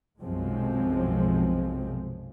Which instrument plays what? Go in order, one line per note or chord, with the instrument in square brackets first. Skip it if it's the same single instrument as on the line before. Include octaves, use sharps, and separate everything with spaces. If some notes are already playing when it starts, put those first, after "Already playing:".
[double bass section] B1 F#2 C3 F3 G#3 C4